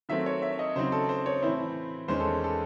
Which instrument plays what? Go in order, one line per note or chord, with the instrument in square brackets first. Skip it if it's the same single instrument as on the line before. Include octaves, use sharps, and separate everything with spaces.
[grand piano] D#3 F#3 A3 C4 E5
C#5
E5
D#5
C#3 F#3 C4 D#4 C5
A4
C5
C#5
A2 E3 C4 E4 C5
E2 D#3 G#3 C#4 C5
A4
A4